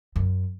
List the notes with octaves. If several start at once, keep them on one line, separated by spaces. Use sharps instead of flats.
F#2